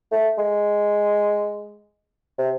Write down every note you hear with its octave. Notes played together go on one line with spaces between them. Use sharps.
A3
G#3
C3